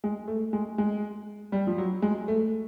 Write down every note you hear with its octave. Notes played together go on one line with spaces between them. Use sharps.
G#3
A3
G#3
G#3
G3
F3
F#3
G#3
A3